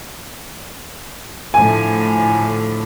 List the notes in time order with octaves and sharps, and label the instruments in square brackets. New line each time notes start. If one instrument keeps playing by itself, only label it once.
[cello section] A2 D3 F3 [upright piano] G#5